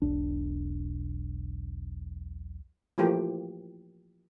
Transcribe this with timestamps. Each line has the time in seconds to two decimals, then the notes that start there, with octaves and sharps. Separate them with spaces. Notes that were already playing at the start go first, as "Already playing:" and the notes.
0.02 E1 B1 D4
2.98 E3 F3 A3 A#3 G4